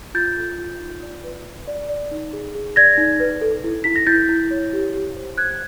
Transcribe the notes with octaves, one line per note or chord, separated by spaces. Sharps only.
F4 G6 A6
A4
F4
D#4
D5
B4
B4
D5
D5
D#4
G#4
G#4
D5 G#6 A#6
D#4
B4
A4
E4
E4 B6
A#6
E4 G6 A6
E4
C#5
G4
G4
C5
C5 F#6 G#6